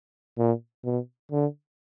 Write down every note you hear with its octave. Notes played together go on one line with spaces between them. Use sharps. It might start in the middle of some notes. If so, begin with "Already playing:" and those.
A#2
B2
D3